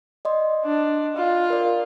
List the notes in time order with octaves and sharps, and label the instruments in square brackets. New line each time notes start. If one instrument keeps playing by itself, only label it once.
[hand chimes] D5 D#5 C6
[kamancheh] D4
F4
[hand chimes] A#4 D5